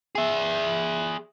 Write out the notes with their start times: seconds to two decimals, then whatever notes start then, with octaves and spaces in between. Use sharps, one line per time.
0.16 G#4 E5